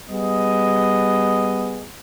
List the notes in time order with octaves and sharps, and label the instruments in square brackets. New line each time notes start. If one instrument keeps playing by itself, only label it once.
[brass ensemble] G3 B3 G#4 D#5